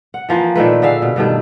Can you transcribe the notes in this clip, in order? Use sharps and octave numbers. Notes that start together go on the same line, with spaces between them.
F#5
E3 F3 A#3 B4
A#2 D#3 A3 B4
D3 G#4 E5 F5
B2
G2 B2 D#3 A3